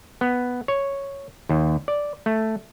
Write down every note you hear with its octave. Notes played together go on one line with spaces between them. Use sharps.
B3
C#5
D#2
D5
A3